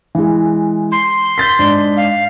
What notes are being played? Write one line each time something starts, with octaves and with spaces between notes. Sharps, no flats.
E3 G#3
C6
G6 A6 B6
G#2 D4
F5